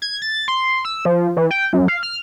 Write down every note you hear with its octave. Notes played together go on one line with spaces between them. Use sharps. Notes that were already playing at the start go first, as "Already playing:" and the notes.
G#6
A6
C6
E6
F3
E3
G5
F#2
F5
F6